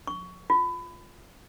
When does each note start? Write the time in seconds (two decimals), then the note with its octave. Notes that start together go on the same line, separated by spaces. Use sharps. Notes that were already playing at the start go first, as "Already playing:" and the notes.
0.07 C#6
0.50 F4